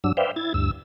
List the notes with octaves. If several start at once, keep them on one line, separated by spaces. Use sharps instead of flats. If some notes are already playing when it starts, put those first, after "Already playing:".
G2 F#3 D4 E6
B4 C5 D5 E5 F5 G5
E4 G#6 A6
D2 G2 E6